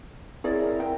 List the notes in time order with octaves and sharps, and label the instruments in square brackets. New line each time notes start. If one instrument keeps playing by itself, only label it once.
[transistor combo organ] C4 E4 A#4 [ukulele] G#4 C#5 D5
[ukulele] G5